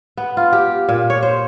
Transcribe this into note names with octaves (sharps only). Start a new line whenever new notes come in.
B3
F4
G4
A#2
C#5
C5